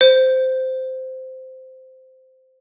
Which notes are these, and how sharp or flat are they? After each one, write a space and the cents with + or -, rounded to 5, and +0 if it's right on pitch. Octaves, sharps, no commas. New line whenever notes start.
C5 -10